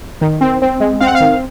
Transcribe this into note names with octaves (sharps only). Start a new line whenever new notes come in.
D#3
C4
C4
G#3
C4 F5
F#5
F5
D#3